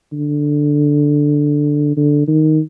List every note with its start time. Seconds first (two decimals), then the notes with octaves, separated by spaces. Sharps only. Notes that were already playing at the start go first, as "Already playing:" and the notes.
0.12 D3
1.97 D3
2.28 D#3